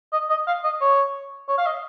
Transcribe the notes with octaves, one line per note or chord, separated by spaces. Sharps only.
D#5
D#5
F5
D#5
C#5
C#5
F5
D#5